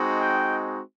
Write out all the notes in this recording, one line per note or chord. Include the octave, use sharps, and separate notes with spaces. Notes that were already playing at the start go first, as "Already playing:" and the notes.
Already playing: G#3 C4 D#4 F#4
G5